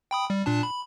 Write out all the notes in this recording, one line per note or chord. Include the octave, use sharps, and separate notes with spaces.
G5 B5 D#6
G3
A#2 D4 A5
B5